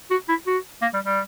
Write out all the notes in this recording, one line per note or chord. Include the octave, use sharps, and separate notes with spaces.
F#4
E4
F#4
A#3
G3
G3